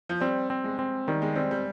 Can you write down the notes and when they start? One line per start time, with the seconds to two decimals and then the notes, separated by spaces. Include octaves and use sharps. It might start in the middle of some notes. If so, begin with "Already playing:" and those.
0.09 F3
0.20 G3 C4
0.50 C4
0.64 G#3
0.79 C4
1.07 D#3 G3
1.22 G#3
1.35 G3 C4
1.51 G3